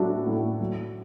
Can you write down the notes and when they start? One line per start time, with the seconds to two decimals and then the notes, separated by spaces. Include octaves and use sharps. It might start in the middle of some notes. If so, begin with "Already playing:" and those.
Already playing: A2 F#3 D4 E4 F#4 A4
0.26 A2
0.60 F#3